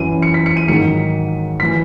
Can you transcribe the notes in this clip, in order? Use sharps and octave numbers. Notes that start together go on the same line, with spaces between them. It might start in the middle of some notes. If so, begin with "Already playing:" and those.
Already playing: F#2 E3 D#7
C#7
B6
C#7
D#7
G#2 D#3 F#3 C#7
E3 B6